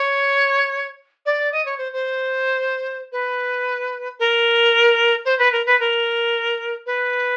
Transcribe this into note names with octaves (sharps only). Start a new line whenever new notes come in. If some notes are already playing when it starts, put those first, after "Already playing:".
Already playing: C#5
D5
D#5
C#5
C5
C5
B4
A#4
C5
B4
A#4
B4
A#4
B4